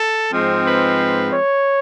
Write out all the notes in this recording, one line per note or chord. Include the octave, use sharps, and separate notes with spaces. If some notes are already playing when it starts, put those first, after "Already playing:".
Already playing: A4
G#2 F3 G#3 C4
B4
C#5